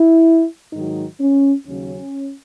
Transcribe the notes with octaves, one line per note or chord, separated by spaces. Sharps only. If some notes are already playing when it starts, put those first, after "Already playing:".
Already playing: E4
G#2 D#3 F#3 D#4
C#4
D#2 C#3 F#3 C#4